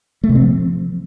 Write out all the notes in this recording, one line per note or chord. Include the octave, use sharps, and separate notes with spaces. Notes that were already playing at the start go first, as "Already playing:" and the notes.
A3
C3
C4
F3